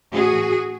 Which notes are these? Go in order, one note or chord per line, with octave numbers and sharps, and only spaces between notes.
A2 E3 A3 C#4 F#4 G#4